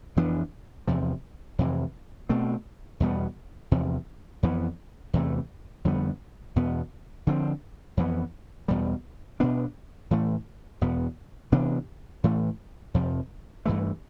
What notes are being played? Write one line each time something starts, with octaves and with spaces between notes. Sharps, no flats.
F2 E3 B3 D4
E2 C3 F3
F2 C3 E3
B2 A3 C4
E2 B2 G3 B3
E2 C3 F3
F2 E3 B3
E2 C3 E3 A3
F2 D3 G3 B3
E2 B2 B3
D3 F3 C4
F2 E3 B3
E2 B2 G3
B2 B3 D4
A2 E3 A3
E2 B2 B3
C3 E3 B3 D4
A2 E3 A3
F2 C3 F3
G2 E3 A3